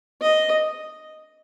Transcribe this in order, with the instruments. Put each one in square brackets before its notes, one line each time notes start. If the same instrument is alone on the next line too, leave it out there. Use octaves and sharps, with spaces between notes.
[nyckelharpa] D#5